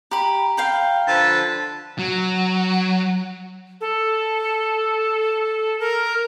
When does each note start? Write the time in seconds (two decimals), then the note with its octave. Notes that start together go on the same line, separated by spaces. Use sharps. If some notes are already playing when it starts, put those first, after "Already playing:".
0.11 G4 A#5 B5
0.57 F5 G5 B5
1.08 D3 F3 B4 A5
1.99 F#3
3.81 A4
5.80 A#4